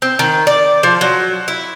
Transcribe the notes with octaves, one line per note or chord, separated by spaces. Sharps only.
C4
D#3
D5
F3
F#3
E4